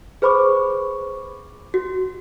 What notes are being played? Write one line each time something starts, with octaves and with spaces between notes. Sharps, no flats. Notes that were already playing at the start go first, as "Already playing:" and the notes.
G#4 B4 C5 B5 C#6 D6
F#4